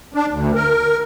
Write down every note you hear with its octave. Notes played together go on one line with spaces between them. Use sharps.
D4
D2
A#4